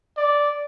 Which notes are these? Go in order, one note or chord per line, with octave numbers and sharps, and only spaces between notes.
D5